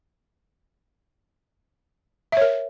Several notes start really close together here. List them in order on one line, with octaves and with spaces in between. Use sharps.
E5 C#5 A#4